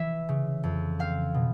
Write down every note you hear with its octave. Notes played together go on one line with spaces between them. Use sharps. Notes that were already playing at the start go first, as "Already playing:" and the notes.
Already playing: E3 E5
C#3
F2
C4 F5
B2